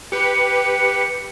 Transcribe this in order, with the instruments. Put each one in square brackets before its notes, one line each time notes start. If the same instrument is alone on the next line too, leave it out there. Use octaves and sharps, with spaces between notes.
[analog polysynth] G4 B4 [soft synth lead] C#7